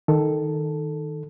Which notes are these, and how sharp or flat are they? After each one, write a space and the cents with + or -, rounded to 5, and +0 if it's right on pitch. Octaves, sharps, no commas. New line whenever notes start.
D#3 +0 A4 +0